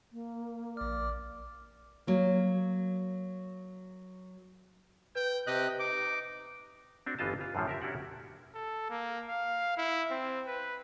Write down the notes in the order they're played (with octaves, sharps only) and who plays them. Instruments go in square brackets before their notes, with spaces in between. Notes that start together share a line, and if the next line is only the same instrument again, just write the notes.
[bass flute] A#3
[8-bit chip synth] A#1 F6 [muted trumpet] D5
[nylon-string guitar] F#3 A#3
[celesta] B4 [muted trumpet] G5
[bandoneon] C3 D#5 F#6 [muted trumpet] G4
[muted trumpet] D#4 [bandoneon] D6
[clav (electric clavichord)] C4 D4 F#4
G1 E3 B3 F4 D#5 A5
F4
F#2 A2 D3 F3
G4 A#4 E5
C#4 D4 E4 F#4 G4 F#5
[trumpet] A4
A#3
F5
E4
C4
B4